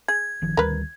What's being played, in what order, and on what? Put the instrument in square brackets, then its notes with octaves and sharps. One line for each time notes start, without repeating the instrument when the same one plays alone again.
[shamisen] G#4 [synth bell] G#6
[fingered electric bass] G1 D#3 F3
[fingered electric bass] D2 D#3 G3 [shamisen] A#4 B4